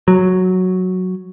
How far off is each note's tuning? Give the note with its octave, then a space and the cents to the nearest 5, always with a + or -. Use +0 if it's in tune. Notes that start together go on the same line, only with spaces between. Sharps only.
F#3 -5